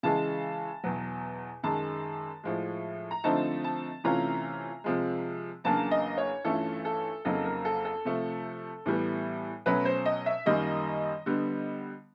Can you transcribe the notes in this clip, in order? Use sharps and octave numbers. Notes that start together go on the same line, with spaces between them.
C#3 E3 G#3 A5
E2 B2 F#3
F#2 D#3 G#3 A5
A2 F3 G#3
A#5
D3 F3 A3 C4 D#4 A5
A5
C3 E3 A3 C#4 F4 A#5
C3 F3 G#3
E2 C#3 F#3 A#3 D4 A5
D#5
C#5
G2 E3 A3 C#4 F4 A4
A4
F2 C#3 F#3 A#3 D#4 A4
A#4
A4
A4
C3 F3 A3
A2 E3 G3 B3
B2 F#3 A3 C#4 B4
C5
D#5
E5
F#2 D#3 G3 A#3 D#5
D3 G3 B3